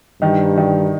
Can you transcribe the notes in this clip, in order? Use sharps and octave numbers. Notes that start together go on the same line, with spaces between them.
G2 D#3 D#4
D#3 D#4